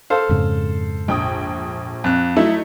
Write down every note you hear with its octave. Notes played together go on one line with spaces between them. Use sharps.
A4 C5 F5
F2 G#2 C#3
A#1 G5 D#6
F2 F#6
F#3 A3 D#4 E4